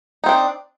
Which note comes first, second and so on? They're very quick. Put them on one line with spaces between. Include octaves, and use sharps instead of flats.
D#4 C4 D4